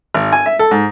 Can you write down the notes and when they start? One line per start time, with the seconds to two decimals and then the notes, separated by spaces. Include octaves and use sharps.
0.15 G#1
0.33 G#5
0.46 E5
0.59 A4
0.71 G#2